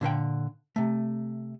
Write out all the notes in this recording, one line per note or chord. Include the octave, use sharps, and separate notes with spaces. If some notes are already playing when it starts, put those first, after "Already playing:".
A#2 D3 C5 G5
C3 A3